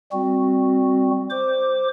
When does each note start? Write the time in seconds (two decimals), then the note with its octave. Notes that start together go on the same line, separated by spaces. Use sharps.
0.12 G3 C4 F#4
1.30 C5 D6